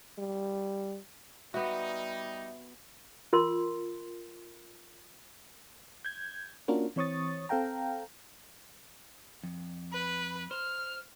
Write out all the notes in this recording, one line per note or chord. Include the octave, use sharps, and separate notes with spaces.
G3
G3 B3 D#4 F#4 E5
F4 A#4 C6
G6 G#6
A#3 C#4 D4 F4 F#4 A#4
E3 C4 C#5 C#6 D#6 A6
C4 A4 F5 G5 A#5
F2
B4
C5 F6